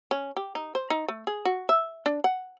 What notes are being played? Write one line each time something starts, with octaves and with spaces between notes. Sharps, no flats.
C#4
G4
D#4
C5
D#4
A3
G#4
F#4
E5
D4
F#5